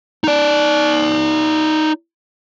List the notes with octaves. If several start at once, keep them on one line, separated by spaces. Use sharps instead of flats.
D#4 D5